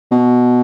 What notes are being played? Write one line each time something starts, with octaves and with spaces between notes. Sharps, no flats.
B2